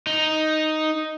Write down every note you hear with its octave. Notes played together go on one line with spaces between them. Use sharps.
D#4